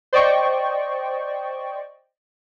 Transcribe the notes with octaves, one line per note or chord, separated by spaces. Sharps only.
C5 D5 D#5 G5 C#6